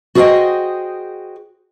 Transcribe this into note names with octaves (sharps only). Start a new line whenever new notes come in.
F#4 G#4 C5 D5 D#5 G5